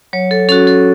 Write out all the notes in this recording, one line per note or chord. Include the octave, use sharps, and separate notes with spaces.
F#3 C#5
A4
C#4 F#4 A4
A4